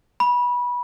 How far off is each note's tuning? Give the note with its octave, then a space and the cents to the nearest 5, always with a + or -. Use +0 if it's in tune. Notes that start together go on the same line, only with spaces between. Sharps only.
B5 -20